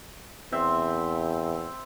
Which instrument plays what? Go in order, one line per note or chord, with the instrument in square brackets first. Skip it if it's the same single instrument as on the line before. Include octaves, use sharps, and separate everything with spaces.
[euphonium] E2 [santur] C4 C5 E5